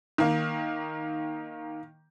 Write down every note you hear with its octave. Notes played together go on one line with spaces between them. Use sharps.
D#3 A#3